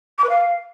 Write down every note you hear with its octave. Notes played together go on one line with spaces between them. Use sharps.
D6
B4
F5